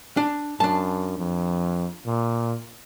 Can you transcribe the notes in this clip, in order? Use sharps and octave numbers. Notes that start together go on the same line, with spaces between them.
D4
F#2 D4 A5
F2
A#2